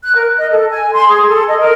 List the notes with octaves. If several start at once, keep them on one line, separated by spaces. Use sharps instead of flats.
F#6
A#4
D#5
A4
G#5
C6
G#4
A4
D#5
A#4